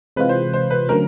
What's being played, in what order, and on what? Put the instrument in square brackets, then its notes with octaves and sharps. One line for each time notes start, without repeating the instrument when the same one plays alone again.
[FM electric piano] C3 E3 G#3 C4 F4 [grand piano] B4
[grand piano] C5
C5
B4
[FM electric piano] D3 F#3 A3 C#4 [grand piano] A#4